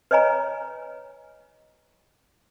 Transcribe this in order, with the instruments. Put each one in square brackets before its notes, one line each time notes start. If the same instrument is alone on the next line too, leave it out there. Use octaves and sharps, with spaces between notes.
[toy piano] B4 C#5 D#5 G#5 A#5